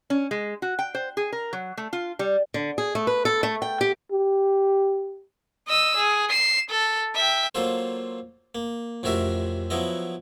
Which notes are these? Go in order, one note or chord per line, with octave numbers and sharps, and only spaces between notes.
C#4
G#3
F#4
G5
C5
G#4
A#4
F#3
A3
F4
G3
D3
G#4
A3
B4
A4
A3
G5
G4
G4
D#5 E6
G#4
C7 E7
A4
E5 G5
F#3 A#3 F4 A4 C5
A#3
A1 F2 C3 F#4 A#4 E5
F3 F#3 B3 E4 D#5